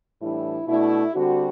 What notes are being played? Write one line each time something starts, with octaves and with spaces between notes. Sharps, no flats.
A2 E3 G3 D4 E4
B2 A3 D4 E4
D3 G3 C4 F#4